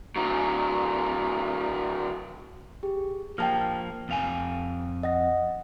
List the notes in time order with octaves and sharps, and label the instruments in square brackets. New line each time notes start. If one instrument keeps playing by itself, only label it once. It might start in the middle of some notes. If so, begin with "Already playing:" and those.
[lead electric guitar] D3 F#3
[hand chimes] G4 G#4
[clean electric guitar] F3 A#3 [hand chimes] G5 A5 F6
[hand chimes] F6
[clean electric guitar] F2 F5 G#5
[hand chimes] D#5 F#5 A#6